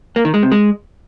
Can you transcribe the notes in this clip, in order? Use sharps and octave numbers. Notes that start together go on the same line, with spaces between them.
A#3
D#3
G#3
C3
G#3